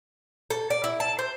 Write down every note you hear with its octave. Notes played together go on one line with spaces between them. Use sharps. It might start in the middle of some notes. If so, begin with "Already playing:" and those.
A4
D5
E4
A5
C5